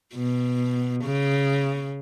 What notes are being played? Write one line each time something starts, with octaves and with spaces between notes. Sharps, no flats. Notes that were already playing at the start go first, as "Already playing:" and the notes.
B2
C#3